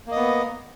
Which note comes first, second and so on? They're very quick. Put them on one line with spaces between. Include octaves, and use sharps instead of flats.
A#3 D#5 B3